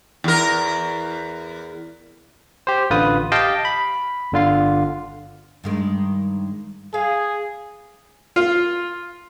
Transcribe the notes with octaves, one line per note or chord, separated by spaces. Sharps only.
E2 A#4
G4 C5
A1 D3 F4 B4 D#6
G4 D#5 F5 G5 A5
B5
G1 D3 F4 F5
G2 D#3 G#3
G#4 F5
F4